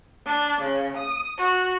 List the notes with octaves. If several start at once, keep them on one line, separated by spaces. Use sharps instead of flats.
D4
C#3
D#6
F#4